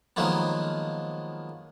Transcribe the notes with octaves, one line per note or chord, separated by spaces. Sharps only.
D#3 F3 F#3 G#3 A#3 B3